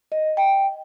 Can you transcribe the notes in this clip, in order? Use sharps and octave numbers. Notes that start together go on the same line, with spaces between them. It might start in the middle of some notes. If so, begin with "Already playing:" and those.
D#5
G5